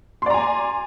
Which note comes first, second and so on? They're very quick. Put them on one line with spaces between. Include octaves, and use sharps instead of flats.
C6 D5 A#5 G#5